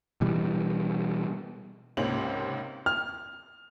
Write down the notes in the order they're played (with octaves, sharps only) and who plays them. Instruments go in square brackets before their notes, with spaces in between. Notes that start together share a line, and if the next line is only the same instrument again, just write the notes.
[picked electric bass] B2 E3 G3
[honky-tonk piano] C#2 G#2 C3 A#3 C#4 F#7
[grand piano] F6